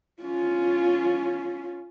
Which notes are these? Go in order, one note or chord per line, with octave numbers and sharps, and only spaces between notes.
C#4 F4